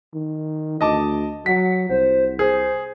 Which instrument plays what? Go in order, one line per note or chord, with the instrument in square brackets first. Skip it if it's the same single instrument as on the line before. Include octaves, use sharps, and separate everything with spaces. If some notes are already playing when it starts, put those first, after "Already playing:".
[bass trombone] D#3
[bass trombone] D2 [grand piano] D#5 A5 D6
[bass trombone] F#3 [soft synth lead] F#5 [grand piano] B6
[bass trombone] C2 [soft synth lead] C5
[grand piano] G#4 [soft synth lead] C5